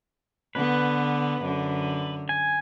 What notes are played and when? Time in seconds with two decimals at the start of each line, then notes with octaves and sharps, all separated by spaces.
0.55 D3 B3 B4
1.42 F#2 D3
2.29 G#5